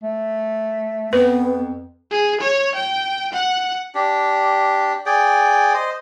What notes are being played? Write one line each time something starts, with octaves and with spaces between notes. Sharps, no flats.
A3
F2 B3 B4
G#4
C#5
G5
F#5
D4 G4
G#4 D5 G5
C5 D#5